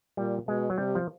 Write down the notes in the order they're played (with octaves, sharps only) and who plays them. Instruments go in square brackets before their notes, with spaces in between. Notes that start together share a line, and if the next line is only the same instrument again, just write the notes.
[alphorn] A#2 [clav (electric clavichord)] G3
[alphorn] B2 [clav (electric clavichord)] G#3
[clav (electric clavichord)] F#3
[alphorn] C3 [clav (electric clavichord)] G3
[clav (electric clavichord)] F3